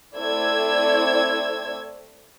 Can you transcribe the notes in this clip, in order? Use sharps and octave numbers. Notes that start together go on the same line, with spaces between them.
A3 C4 E4 D5 E6 G#6